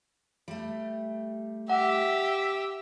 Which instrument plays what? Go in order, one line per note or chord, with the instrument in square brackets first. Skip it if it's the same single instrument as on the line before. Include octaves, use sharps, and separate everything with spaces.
[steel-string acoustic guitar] G3 A3
[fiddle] G4 [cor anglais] E5 [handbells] F#5